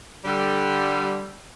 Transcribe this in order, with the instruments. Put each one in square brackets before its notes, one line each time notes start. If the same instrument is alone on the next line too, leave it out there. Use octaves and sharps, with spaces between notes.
[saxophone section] D3 G3